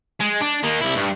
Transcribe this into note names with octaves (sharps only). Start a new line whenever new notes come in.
G#3
D4
D#3 A#3
C2 E4
G2